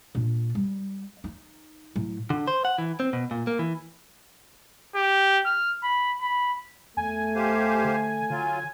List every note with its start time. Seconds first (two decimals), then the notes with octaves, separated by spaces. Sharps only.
0.15 A#2 D4
0.55 G3
1.24 D#4
1.96 A2 F#3
2.30 D3
2.48 C5
2.65 F#5
2.78 E3
3.00 C4
3.13 B2
3.31 A#2
3.47 A#3
3.59 E3
4.96 G4
5.46 F6
5.83 B5
6.21 B5
6.97 E2 A3 G#5
7.35 G4 C5 F5
7.84 D3
8.30 D3 F#3 F4